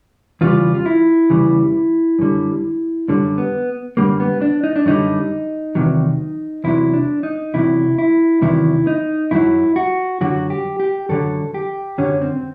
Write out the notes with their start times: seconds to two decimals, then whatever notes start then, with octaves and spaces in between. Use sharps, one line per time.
0.41 E2 C#3 E3 G3 F4
0.74 F4
0.86 E4
1.30 E2 C#3 E3 G3
2.19 F#2 D3 G3
3.08 F#2 D3 G3
3.38 B3
3.97 F#2 D3 G3 A#3
4.20 B3
4.42 D4
4.64 D#4
4.76 D4
4.86 F#2 D3 G3 D#4
5.75 E2 C3 D#3 F#3
6.64 E2 C3 D#3 F#3 E4
6.94 D4
7.23 D#4
7.54 E2 C3 D#3 F#3 E4
7.98 E4
8.42 E2 C3 D#3 F#3 E4
8.87 D#4
9.31 F#2 D3 F#3 E4
9.76 F#4
10.21 F#2 D3 F#3 F#4
10.50 G4
10.80 G4
11.09 F#2 D3 F#3 A4
11.54 G4
11.98 F#2 D3 F#3 C#4
12.22 C4